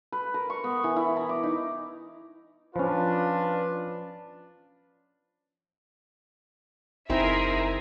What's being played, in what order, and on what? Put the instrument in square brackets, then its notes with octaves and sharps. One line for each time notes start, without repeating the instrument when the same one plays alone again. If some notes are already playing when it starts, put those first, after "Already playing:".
[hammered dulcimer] B4
A#4
C#6
B3
E3
E4
A#5
D6
D#4
[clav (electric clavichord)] F3 C#4 [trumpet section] D4 F4 B4
[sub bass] F#1 [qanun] C4 D#4 E4 [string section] G#4 A#4 E5